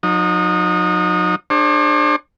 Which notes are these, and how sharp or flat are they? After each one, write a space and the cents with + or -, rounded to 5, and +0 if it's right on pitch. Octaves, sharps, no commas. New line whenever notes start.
F#3 -45 D#4 -15
D4 +25 G#4 +0 C5 +45